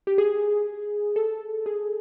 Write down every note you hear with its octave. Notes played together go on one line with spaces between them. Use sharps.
G4
G#4
A4
G#4